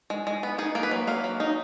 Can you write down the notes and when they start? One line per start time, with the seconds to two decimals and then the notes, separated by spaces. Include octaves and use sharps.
0.10 G#3
0.27 G#3
0.43 B3
0.58 D#4 G#4
0.75 A#3
0.83 B4
0.91 F#3
1.07 A#3 F5
1.24 F#3
1.40 D#4